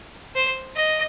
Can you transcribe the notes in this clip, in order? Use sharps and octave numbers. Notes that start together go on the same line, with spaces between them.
C5
D#5